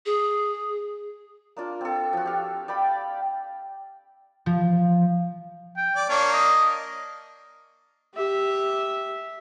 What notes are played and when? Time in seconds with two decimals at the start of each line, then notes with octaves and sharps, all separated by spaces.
0.06 G#4
1.57 A#3 D4 F4
1.81 C4 A4
2.13 F3 F#4
2.26 G4 F5
2.68 D5 G5 B5
4.46 F3
5.77 G5
5.96 D5
6.09 A#3 D4 C#5
6.33 D#5
8.14 G4 E5